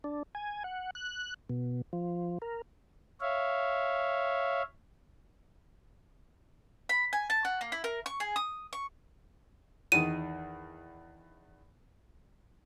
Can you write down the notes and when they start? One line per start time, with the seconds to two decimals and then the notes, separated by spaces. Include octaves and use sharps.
0.04 D4
0.35 G#5
0.64 F#5
0.95 F#6
1.49 B2
1.93 F3
2.42 A#4
3.21 C#5 E5 F5
6.89 B5
7.13 G#5
7.30 A5
7.45 F#4
7.61 A#3
7.72 E4
7.84 A#4
8.06 C#6
8.20 G#4
8.36 D#6
8.73 C#6
9.92 E2 D#3 D#7